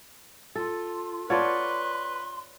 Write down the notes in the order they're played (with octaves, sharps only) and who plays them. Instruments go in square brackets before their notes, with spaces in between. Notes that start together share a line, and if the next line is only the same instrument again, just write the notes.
[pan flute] F4 [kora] A4
[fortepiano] F4 F#5 A5 [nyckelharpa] B4 [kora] C#5 D5 [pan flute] C6